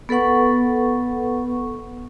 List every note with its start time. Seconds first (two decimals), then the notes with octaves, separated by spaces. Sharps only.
0.09 B3 A4 B4 F#5 C#6